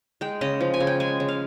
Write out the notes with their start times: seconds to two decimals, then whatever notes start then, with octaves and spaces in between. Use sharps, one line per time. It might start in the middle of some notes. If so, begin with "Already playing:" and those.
0.21 G#3 G5
0.41 C#3 D#5
0.61 F3
0.74 G#5
0.81 C#3
0.87 G5
1.00 G#3 G#5
1.20 C#3
1.28 F5